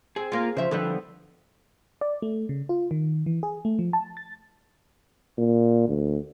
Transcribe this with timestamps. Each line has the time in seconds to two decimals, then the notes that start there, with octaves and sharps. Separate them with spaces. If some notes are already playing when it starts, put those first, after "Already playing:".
0.16 C4 G#4
0.32 A#3 F4
0.57 C#3 F3 C5 E5
0.71 D3 F3 G3 B3 A4
2.01 D5
2.22 A3
2.49 C#3
2.69 F4
2.91 D#3
3.26 E3
3.43 G#4
3.65 A3
3.79 F3
3.93 A5
4.17 A6
5.38 A#2
5.88 D2